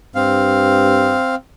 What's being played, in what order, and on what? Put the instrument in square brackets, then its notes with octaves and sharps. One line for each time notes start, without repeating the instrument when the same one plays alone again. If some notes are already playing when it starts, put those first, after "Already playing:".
[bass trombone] G2 [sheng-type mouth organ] C4 F5